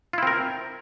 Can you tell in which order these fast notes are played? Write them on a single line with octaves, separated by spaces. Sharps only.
F4 E4 C4 A#4